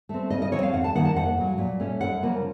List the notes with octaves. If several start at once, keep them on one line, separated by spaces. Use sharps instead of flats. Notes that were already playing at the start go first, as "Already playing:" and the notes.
A3 C4
C#3 D#5
D#5
F3 C4 C#5
F5
F2 F#5
A5
D#3 A#3 F#5
A5
F2 F#5
C#3 F#3
A#2
A3 C#4
F#2 F#5
C#3 F3 A#3 C#4